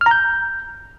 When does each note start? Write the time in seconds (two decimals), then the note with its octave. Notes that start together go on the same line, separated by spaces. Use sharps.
0.01 F6
0.06 A#5
0.11 G6